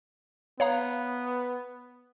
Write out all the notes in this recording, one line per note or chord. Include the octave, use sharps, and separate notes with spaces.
B3 C#5 F5 A#5